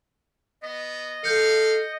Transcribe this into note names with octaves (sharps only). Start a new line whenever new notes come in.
B3 D#5
A4 F5 G6 C#7